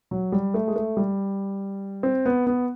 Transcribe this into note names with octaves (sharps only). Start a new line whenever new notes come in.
F#3
G3
A3
G#3
A3
G3
C4
B3
B3